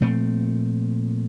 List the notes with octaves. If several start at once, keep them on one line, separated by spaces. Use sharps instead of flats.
A#2 F3 A3 C4